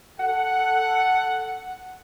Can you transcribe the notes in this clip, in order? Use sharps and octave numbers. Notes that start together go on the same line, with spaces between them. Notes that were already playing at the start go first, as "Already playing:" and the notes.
A4 F#5